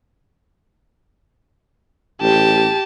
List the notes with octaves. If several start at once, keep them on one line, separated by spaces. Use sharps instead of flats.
A1 G4 A5